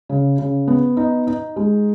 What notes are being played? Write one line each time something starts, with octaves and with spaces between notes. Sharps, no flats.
C#3
C#3
B3
D#4
D#4
G#3